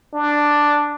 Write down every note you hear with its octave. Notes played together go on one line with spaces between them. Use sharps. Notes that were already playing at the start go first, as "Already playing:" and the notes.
D4